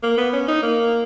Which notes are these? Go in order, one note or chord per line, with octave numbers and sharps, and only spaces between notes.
A#3
B3
C#4
D#4
A#3